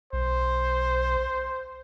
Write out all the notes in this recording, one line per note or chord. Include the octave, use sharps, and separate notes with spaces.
B1 C5